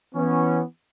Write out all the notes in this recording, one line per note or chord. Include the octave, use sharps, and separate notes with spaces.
E3 B3 C#4